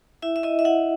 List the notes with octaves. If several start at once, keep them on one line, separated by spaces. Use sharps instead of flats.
E4 E5
E5
E4 D#5
E5
E4 F#5